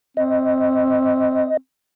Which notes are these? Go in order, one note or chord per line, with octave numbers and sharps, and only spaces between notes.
C4 D#5